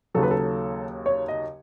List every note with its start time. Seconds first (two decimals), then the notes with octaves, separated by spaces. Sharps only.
0.14 D#2 C#3 F#3 A4
0.23 B4
0.31 A4
1.06 C#5
1.28 D#5